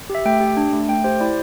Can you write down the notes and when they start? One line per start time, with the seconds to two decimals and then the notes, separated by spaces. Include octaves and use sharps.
0.10 G4
0.15 E5
0.25 A3 G5
0.41 G4
0.57 D4
0.73 A3
0.89 A3 G5
1.04 G4 C5
1.20 E4 D5